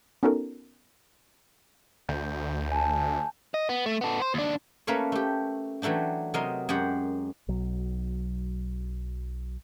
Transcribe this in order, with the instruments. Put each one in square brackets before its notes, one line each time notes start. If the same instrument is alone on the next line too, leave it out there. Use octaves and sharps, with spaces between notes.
[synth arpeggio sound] B3 C#4 D#4 F#4 A4 A#4
[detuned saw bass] D2 [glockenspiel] G6
[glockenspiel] G#5 A5
[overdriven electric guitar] D#5
B3
A3
B3 A4
C5
D#2 D4
[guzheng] A3 A#3 C#4 A#4 B4 C#5
A3 G4
E3 F#3 A3 D4 G4
C3 F#3 A#4 D#5 C6
F#2 G#3 G4 F#5
[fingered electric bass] B1 F#3